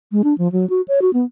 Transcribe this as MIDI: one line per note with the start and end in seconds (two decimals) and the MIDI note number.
0.12 0.22 56
0.24 0.36 62
0.38 0.50 53
0.52 0.68 54
0.70 0.81 66
0.88 1.00 73
1.02 1.11 66
1.13 1.25 59